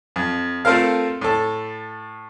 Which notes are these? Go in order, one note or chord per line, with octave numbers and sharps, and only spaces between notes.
F2
A3 C4 F4 A4 A#4 F5
A2 A4